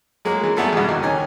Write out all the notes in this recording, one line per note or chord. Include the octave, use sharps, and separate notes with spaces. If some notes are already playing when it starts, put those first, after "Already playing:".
F#3 G#3 A#3
E3
G3 A3 B3 E4 G#4 A4
E2 G2 B2
D#2
D#3 C#4 G#5